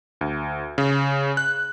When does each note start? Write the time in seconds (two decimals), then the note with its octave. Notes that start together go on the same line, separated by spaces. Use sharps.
0.21 D2
0.78 C#3
1.37 F#6